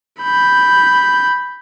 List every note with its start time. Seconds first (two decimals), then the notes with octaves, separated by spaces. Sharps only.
0.22 B5 G6